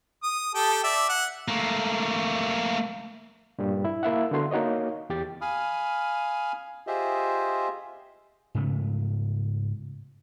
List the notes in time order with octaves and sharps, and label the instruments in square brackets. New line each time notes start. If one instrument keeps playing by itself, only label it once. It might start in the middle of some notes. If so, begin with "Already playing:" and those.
[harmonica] D#6
G4 A4 G5
D5 E5
F#5
[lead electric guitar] A3 A#3
[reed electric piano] G2 A#2 G3
E4
A#3 E4 E5 F#5
D3 B3 F#4 C6
A#3 D#4 F#4 C#5 D#5
E2 G4 A6
[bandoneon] F5 G#5 B5 D#6 F6
F4 G4 G#4 C5 D#5 E5
[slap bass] G#2 C#3 A3